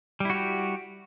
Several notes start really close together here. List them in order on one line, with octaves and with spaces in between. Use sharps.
G3 E4 F#4 G4